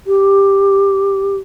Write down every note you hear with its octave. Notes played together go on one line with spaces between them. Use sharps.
G4